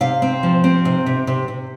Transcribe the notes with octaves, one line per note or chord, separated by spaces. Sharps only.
C3 F5
C4
F3
C4
C3
C3
C3
C3